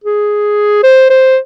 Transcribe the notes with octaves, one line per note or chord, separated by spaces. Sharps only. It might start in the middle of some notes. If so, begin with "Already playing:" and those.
G#4
C5
C5